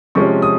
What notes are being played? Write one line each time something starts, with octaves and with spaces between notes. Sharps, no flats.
C3 F3 G#3 C#4 C#6
D#6